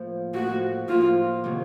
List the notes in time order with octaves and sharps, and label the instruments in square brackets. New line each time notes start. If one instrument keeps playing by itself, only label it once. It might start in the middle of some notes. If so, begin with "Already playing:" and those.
Already playing: [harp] A2 F3 A#3
[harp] A2 F3 A#3 [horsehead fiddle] F#4
[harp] A2 F3 A#3 [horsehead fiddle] F4
[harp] C3 D#3 F#3 A#3